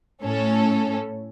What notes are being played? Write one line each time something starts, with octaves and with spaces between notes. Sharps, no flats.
A2 C#4 A4